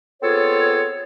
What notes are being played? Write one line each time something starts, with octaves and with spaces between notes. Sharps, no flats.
B3 C4 F4 G#4 A4 C#5